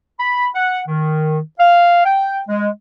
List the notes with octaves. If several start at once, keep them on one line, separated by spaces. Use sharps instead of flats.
B5
F#5
D#3
F5
G5
G#3